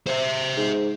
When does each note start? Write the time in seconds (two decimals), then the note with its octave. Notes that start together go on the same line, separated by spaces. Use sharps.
0.07 C5 E5
0.57 G#2